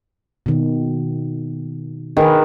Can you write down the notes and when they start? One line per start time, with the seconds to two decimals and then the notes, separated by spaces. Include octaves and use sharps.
0.46 B2 D#3
2.17 D#3 G#4 A#4 B4